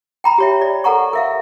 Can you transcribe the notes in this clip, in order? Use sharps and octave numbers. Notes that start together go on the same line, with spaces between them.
G5 A#5 B5
G4 C#5 E5
D5
A4 A#4 F#5 A#5 C#6
A#4 E5 F5